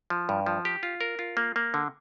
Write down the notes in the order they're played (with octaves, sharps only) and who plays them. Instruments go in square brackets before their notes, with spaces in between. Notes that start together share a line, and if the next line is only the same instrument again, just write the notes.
[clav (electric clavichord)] F3
G2
F3
G4
F4
A#4
F4
A#3
A#3
D3